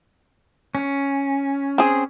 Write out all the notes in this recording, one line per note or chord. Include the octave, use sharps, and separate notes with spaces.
C#4
C4 G#4